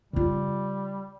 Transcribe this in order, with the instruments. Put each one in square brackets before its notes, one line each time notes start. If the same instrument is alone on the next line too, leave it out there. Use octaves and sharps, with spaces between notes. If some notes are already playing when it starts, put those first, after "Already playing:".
[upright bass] C#3 F4 [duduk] G3